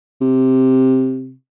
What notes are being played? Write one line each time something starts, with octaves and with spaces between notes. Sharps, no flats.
C3